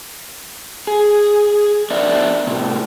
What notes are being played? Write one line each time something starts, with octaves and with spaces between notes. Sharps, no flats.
G#4
B3 D4 A#4 D5 E5
A2 C3